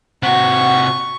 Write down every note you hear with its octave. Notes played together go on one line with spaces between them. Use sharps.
C3 F#4 F#5 C#6